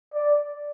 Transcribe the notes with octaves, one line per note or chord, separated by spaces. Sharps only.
D5